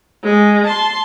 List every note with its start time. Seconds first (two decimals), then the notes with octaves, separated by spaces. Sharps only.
0.24 G#3
0.67 A5 C6